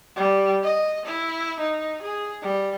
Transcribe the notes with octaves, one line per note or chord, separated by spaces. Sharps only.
G3
D#5
E4
D#4
G#4
G3